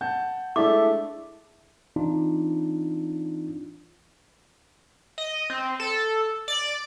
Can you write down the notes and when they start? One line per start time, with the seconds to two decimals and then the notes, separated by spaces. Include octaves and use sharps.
0.01 F#5 A5 G6
0.56 G#3 A3 D4 E4 D6
1.96 E3 C4 D4 D#4 F4
5.18 D#5
5.50 C4
5.80 A4
6.48 D5